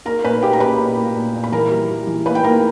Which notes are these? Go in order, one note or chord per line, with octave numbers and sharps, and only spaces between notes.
A#3 A#4 A#5
A#2 B4 B5
A#3 G4 G5
A#5
C#4 B4 B5
A#2
A#3
A#2
A#2
B5
E3 A#4 A#5
G3
G3
E3
A#3 B4 B5
G5
A#3 A#4 A#5